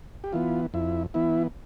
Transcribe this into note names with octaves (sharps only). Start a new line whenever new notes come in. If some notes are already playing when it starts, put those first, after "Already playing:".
G4
E3 B3 F4
F2 E4
E3 B3 E4